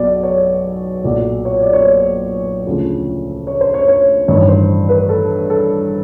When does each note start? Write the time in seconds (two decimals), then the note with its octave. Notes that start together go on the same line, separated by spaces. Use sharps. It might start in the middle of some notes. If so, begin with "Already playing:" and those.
Already playing: B1 B2 F#3 D5
0.23 C#5
1.04 B1 A#2 F#3 D5
1.45 C#5
1.62 D5
1.73 C#5
1.85 C5
2.67 D2 C#3 F3
3.47 C#5
3.61 C5
3.74 C#5
3.88 C#5
4.28 A1 G2 D#3 C#5
4.49 C5
4.89 B4
5.09 A4
5.50 A4